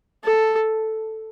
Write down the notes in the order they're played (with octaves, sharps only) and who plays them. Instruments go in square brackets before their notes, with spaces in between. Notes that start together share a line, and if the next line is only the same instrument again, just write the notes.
[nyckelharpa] A4